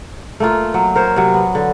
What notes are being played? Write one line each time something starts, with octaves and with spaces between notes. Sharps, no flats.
A3 A#3 F4
F#3
A#4 C5 C#5
C3 F#3
B3
D3